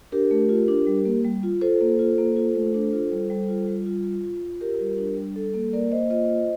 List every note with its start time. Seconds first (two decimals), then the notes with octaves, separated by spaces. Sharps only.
0.12 D4 G4 A#4
0.31 A3
0.49 F4
0.68 D4
0.87 G3
1.05 A#3
1.24 G3
1.43 F4
1.61 F4 A4 C5
1.81 A#3
1.99 F4
2.18 A#3
2.37 F4
2.55 A3
2.74 D4
2.93 F4
3.12 G3
3.30 G3
3.49 F4
3.68 G3
3.86 F4
4.05 F4
4.24 F4
4.42 F4
4.61 F4 G4 A#4
4.80 G3
4.98 D4
5.17 G3
5.36 G3 A4
5.54 A#3 A4
5.73 A#3 A#4 D5
5.92 A#3 C5 D#5
6.10 F4 C5 D#5
6.30 F4